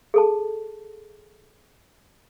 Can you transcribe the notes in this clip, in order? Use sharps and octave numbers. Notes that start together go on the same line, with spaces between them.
G#4 A4 A5